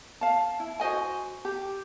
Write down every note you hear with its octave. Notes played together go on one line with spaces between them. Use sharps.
F5 A5
E4
F#4 C5 D#5 G#5
G4